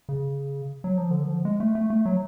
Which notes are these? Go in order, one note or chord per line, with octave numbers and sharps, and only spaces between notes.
C#3
F#3
F3
D3
F3
G#3
A3
A3
A3
F#3